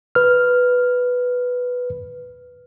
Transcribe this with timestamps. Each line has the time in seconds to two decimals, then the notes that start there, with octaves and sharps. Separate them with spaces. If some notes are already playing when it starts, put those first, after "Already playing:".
0.15 B4 F6